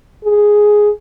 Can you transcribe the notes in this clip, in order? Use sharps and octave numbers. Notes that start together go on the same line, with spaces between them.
G#4